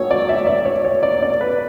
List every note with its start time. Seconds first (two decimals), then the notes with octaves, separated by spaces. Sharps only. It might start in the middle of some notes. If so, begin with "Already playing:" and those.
Already playing: G#1 F#3 C#5
0.11 D5
0.29 E5
0.47 D5
0.65 C#5
0.85 C#5
1.03 D5
1.23 D5
1.41 B4